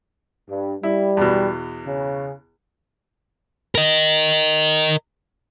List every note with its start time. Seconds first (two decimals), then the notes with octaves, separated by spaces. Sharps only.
0.49 G2
0.83 G3 E4
1.17 E2 B2
1.86 C#3
3.75 A#4 D#5